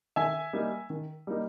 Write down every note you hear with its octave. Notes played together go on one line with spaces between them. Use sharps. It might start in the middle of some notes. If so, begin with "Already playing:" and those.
D#3 E5 G#5
G3 A#3 D#4
D#3
G3 A#3 D#4